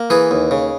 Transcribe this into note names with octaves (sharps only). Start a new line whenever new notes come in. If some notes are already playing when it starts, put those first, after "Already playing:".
Already playing: A#3
E3 G#4 B4
D#2
C#3